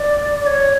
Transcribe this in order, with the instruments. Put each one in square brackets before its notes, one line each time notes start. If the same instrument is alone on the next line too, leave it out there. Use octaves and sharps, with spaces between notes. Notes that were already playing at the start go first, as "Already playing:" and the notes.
Already playing: [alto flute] D5
D5
C#5